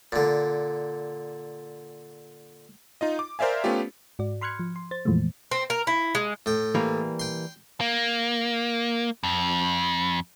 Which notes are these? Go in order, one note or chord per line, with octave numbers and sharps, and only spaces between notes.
A#2 D3
D#4 F4 D#5
D6
A#4 C5 D5 E5 F5 G#5
A3 B3 C#4 F4 G4
G#2 F#4 D5
B5 C6 F6 F#6 G#6 C#7
F3
C6
C5 A6
F2 A#2 E3 F3 G#3 A3
C4
A#4
E4
G#3
A2 G5
E3 G3 A#3
G5 C6
A#3
F2